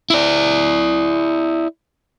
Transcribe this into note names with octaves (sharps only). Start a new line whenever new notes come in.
E4 D5